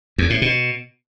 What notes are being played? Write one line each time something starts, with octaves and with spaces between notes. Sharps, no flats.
E2
A2
B2